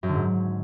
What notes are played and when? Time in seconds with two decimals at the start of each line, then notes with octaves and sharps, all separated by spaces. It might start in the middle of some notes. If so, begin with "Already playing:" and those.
0.03 F#2
0.09 D3
0.14 G#2